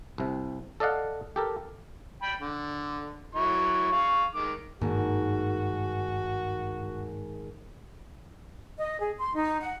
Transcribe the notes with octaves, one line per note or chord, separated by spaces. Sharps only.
C2 C3
A4 D5 D#5 F5 F#5
G4 A4 A#4
G5 B5
D3
F#3 E4 C#6
F5 C#6
D#3 G#3 D6
G#1 G2 A#3 F#4
D#5
G#4
C6
D#4
F#5